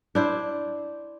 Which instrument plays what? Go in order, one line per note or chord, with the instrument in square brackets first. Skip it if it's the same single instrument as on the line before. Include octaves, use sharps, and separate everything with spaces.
[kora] D4 E4 C5